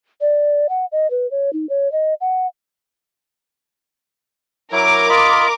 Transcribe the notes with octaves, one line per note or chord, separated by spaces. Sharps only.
D5
F#5
D#5
B4
C#5
D#4
C#5
D#5
F#5
F#3 E4 A#4 D6
F4 D#5 B5